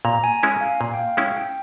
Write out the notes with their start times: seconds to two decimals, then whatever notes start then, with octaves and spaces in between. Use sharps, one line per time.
0.05 A#2 A#5
0.24 G#5
0.43 G#3 C#4 E4 G#5
0.61 F5
0.81 A#2
0.94 G5
0.99 F5
1.17 G#3 C#4 E4 G5
1.37 G5